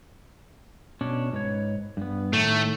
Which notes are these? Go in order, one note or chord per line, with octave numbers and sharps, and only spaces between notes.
B2 C#4 D4
G#2 B4 C#5
G2 B3
A2 D#3 A3